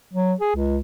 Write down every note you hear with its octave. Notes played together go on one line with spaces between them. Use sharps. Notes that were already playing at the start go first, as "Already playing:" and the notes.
F#3
G#4
C#2